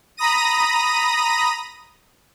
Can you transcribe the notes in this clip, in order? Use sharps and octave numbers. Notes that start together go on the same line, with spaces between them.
A#5 B5 D#6 A#6 D#7